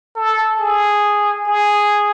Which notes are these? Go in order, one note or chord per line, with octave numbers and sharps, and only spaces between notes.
A4
G#4
G#4